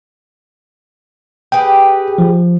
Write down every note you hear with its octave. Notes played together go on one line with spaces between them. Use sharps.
G4 G#4 B4 G5
F3